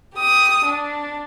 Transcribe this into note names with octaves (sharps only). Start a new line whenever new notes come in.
G4 D#6
D4